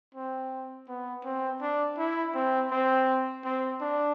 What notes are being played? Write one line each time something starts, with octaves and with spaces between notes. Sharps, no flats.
C4
B3
C4
D4
E4
C4
C4
C4
D4